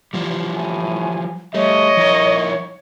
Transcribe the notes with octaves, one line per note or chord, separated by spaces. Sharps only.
E3 F3 G3
A2 G#5
G3 A3 C#5 D#5
F3 E4 A#4